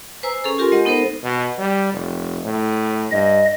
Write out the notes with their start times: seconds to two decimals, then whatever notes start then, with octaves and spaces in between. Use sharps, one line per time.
0.23 B4 C5 G#5 A#5 E6
0.44 C#4 G#4 A4
0.58 F4 G4 A#4 G#5 C6
0.72 G#3 D#5 F#5
0.85 B3 D#4 A4 A#4 C5
1.23 B2
1.59 G3
1.92 F1
2.45 A2
3.11 G2 D#5